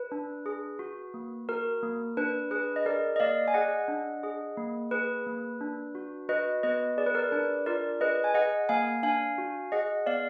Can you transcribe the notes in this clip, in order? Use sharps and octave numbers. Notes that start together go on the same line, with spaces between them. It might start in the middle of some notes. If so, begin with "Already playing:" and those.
Already playing: B4
D4
G#4
F#4
A#3
F#4 A#4
A#3
D4 B4
G#4 B4
D#5
G#4 A#4 D5
D#5
A#3 D5 F5
G#5
G#4 D#5 F#5
D4
G#4
A#3
G#4 B4
A#3
D4
F#4
F#4 B4 D#5
B3 B4 D#5
G#4 D5
B4
A#4 D5
D4 B4
F4 A#4 D5
G#4 B4 D#5
G#5
G#4 D#5 F#5
A#3 F5 G#5
D4 F5 G#5
F#4
G#4 D#5 F#5
B3 D5 F5